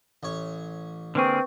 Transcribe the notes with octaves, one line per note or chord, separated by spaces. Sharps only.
A1 C#5
D3 A#3 C4 G#4 B4 C#6